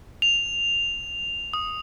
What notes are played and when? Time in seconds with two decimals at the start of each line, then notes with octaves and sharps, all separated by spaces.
0.22 F7
1.53 D#6